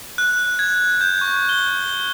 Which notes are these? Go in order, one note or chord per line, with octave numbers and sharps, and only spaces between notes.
F#6
G#6
G6
C#6
G7